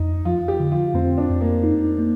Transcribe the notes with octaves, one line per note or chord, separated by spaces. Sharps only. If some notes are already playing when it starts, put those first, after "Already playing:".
Already playing: F2 D#4
F3 F4
G4
D3
F4
F2 C4
D4
F2
A#3
D#4
A#3